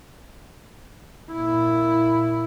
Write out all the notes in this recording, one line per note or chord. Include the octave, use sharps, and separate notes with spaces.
A#2 E4